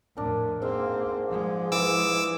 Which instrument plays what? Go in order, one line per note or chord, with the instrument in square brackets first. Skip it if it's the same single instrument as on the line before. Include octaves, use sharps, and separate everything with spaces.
[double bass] F2 A2 [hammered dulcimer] D4 A#4
[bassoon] G#2 [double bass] A#3 C4 [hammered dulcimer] E5 F5
[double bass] F3 G#3
[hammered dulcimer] E3 [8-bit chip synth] D6 E6